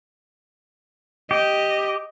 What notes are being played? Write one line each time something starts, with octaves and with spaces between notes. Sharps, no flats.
G4 D#5